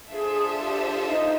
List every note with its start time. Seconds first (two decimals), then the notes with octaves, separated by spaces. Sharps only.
0.12 D4 F4 G#4 A4 C5 E5
0.59 G4
1.06 D#4